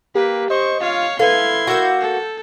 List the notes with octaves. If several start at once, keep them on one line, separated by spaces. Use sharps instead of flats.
A#3 G4 B4
C5 D#5 C#6
F4 C#5 F5
E4 A4 B4 F5 C6 G#6
A#3 F#4 F#5 E6 G6
A4